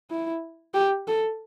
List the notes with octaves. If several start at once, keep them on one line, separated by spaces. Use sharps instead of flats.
E4
G4
A4